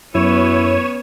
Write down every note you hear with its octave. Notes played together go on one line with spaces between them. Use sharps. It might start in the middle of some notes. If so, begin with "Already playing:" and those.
F#2 B3 C#4 E4 C#5 D#7 E7